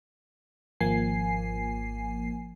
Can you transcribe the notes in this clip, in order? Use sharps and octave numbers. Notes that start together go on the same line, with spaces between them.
G#1 F3 A#3 G#5 C7